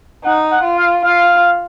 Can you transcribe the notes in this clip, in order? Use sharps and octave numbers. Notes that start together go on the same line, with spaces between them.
D#4 F#5
F#5
F4
F5
F4 F5